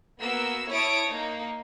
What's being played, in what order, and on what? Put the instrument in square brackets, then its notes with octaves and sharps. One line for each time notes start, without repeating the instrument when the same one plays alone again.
[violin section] A#3 B3 F#4 E6
E4 C#5 A5 D#6 D7
A#3 D#4